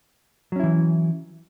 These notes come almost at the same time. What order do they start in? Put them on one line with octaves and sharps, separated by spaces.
F#3 C#4 E4 E3